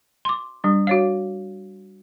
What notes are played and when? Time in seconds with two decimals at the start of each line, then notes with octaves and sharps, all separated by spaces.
0.25 C6 D6
0.64 G3 D4
0.87 F#4 C#5 F5